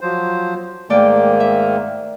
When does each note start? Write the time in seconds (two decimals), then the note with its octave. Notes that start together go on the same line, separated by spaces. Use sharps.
0.01 F3 F#3 C5
0.90 G#2 D#3 A3 A#3 D5 G5
1.40 E5